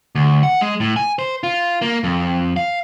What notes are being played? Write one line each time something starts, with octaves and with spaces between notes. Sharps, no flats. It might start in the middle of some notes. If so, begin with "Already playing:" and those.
D2
F#5
G#3
A2
G#5
C5
F4
A#3
F2
F5